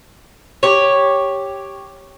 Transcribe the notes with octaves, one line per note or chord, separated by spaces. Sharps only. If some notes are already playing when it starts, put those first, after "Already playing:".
G4 C#5